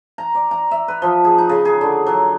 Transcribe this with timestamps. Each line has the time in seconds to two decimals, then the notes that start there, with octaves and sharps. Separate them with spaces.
0.18 A#5
0.35 D5
0.51 A#5
0.71 E5
0.88 B4
1.02 F3
1.25 G#4
1.38 D#4
1.49 C#3
1.65 G#4
1.81 D3
2.07 F#3